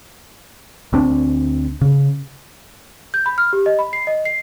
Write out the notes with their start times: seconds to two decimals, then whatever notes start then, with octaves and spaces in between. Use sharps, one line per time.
0.93 D2 C4 D4
1.81 C#3
3.14 G6
3.26 B5
3.38 F6
3.53 G4
3.66 D#5
3.79 B5
3.93 C7
4.07 D#5
4.25 C7